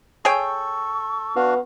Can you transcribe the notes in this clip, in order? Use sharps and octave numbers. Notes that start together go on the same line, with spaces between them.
G#4 A4 C#5 G5 C#6
B3 D4 F#4 F5